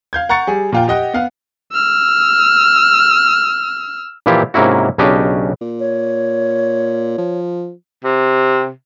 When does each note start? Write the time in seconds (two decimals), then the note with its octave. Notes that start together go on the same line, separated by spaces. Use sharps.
0.13 F5 G6 G#6
0.29 F#5 A#5 C#6 A6 C#7
0.47 G3 G#4
0.72 A#2 F4 G5
0.88 G4 D#5 F#5 G5
1.14 B3 F5 F#5
1.72 E6 F6
4.26 A#2 E3 F3 E4 F4 G4
4.54 G#2 C3 A#3 C#4 E4 F#4
4.98 B1 C#3 C#4 D4 G4 D#5
5.61 A#2
5.80 C#5
7.18 F3
8.04 C3